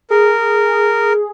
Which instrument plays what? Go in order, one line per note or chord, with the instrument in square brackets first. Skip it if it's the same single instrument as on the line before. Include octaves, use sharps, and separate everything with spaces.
[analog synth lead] G#4 [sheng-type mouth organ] A#4